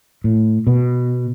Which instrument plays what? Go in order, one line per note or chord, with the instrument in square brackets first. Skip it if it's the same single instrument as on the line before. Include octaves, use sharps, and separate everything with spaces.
[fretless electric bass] A2
B2